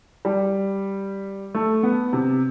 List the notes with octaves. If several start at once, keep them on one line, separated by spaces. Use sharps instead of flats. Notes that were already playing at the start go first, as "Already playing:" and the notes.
G3
A3
B3
C3